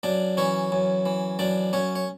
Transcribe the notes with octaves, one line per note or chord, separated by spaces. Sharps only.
F#2 D4 D5
E3 C#4 C#5
F#2
E3
F#2 D4 D5
F#2 C#4 C#5
C#5